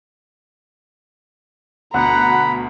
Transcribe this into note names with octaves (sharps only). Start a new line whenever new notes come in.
D2 B2 F#5 A#5 B5